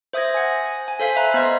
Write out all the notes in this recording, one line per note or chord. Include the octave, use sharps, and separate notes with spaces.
C5 E5 D#6 G6 G#6 A#6
F#5 G#5
G#5
A4 C5 F5 B6
E5 A#5 B5 F#6
B3 C5 D#5 G6